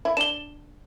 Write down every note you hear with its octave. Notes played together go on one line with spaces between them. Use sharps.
E4
D4 E7 G7